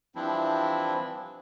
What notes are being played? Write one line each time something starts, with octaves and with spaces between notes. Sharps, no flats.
E3 F3 G3 C4 D4 E4